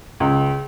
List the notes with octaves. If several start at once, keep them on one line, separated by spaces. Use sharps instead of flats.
C#2